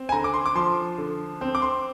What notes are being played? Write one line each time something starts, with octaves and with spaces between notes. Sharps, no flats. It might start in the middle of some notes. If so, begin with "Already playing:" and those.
Already playing: C4
G#5
D3 A#5
D6
C6
D6
F3 C6
D3
C4
D6
C6